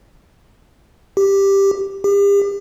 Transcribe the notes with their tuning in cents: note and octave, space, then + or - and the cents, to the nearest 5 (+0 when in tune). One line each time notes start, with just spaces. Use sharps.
G4 +5
G4 +40